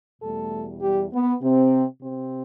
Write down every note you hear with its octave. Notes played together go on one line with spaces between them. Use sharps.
E2 B2 G3 A3 A4
G3 G4
B3
C3 C4
C3 C4